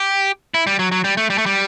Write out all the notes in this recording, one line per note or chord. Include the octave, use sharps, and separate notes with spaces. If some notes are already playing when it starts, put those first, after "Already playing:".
Already playing: G4
E4
G3
F#3
F#3
G3
A3
G3
A3
G3